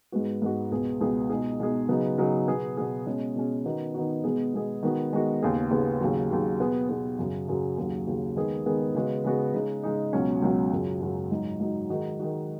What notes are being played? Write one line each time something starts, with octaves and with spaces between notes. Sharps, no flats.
G#2 G#3 B3 F#4
G#2 G#3 B3 F#4
C#2 B2 B3 G#4
C#2 B2 B3 G#4
B2 G#3 D#4 G#4
B2 G#3 D#4 G#4
C#3 F#3 B3 D#4
C#3 F#3 B3 D#4
B2 B3 G#4
B2 B3 G#4
B2 G#3 C#4
B2 G#3 C#4
D#3 B3 D#4 F#4
D#3 B3 D#4 F#4
B2 G#3 B3 G#4
B2 G#3 B3 G#4
D#3 G#3 B3 F#4
D#3 G#3 B3 F#4
D#2 C#3 B3 G#4
D#2 C#3 B3 G#4
D#2 C#3 F#3
D#2 C#3 F#3
B2 B3 G#4
B2 B3 G#4
F#2 C#3 F#3
F#2 C#3 F#3
D#2 C#3 F#3
D#2 C#3 F#3
D#3 G#3 B3 G#4
D#3 G#3 B3 G#4
C#3 G#3 B3 F#4
C#3 G#3 B3 F#4
C#3 G#3 D#4
C#3 G#3 D#4
C#2 B2 F#3 C#4
C#2 B2 F#3 C#4
F#2 C#3 F#3
F#2 C#3 F#3
G#2 F#3 D#4
G#2 F#3 D#4
D#3 G#3 D#4 F#4
D#3 G#3 D#4 F#4